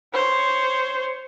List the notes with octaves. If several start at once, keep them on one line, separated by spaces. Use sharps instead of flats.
C5 C#5